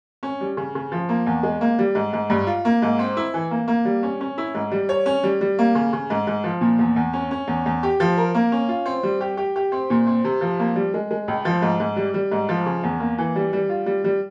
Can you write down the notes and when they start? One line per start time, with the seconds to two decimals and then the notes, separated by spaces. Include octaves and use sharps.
0.23 C#4
0.41 G3
0.57 C#3
0.75 C#3
0.92 F3
1.09 A#3
1.26 E2
1.43 G#3
1.61 A#3
1.79 G3
1.95 G#2
2.13 G#2
2.30 G2
2.47 F4
2.65 A#3
2.82 G#2
2.99 C4
3.17 E4
3.34 E3
3.51 A#3
3.68 A#3
3.85 G3
4.03 C#4
4.21 C#4
4.38 E4
4.55 G#2
4.71 G3
4.89 C#5
5.06 C#4
5.23 G3
5.41 G3
5.59 A#3
5.75 C#3
5.93 C#3
6.10 G#2
6.27 G#2
6.44 F3
6.61 A#2
6.79 E2
6.96 E2
7.13 C#4
7.31 C#4
7.47 E2
7.66 E2
7.83 G4
8.00 F3
8.17 A#4
8.35 A#3
8.52 C#4
8.69 F4
8.86 C4
9.03 G3
9.21 G4
9.37 G4
9.56 G4
9.72 C4
9.90 A#2
10.07 C4
10.24 C3
10.41 F3
10.59 A#3
10.76 G3
10.94 G#3
11.11 G#3
11.28 C#2
11.45 F3
11.62 G#2
11.80 G#2
11.96 G3
12.14 G3
12.31 G#2
12.49 F3
12.66 C#3
12.83 E2
13.00 A#3
13.18 E3
13.36 G3
13.53 G3
13.69 F4
13.86 G3
14.04 G3